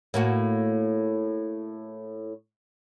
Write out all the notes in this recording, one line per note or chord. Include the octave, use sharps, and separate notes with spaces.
A2 A#3 F#4